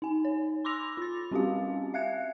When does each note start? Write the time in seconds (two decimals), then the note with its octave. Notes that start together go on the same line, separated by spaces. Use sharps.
0.02 D#4 G#5
0.25 C#5
0.65 B5 C6 D6 E6 A#6 F7
0.97 F4 A6
1.31 G3 C4 C#4 F#4 G4 F5
1.94 E5 F5 F#6 G#6 C#7